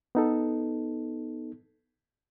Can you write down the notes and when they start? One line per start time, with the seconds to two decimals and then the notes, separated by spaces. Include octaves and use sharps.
0.15 B3 D#4 A4